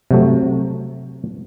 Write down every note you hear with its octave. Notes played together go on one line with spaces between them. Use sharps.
C3 F#3 A3